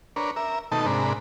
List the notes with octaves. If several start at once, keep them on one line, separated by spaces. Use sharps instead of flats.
D4 A#4 B4 C#5
A#4 E5
B2 D#3 A3 D#4 A4 A5
G#2 C3 D4 A#4 B5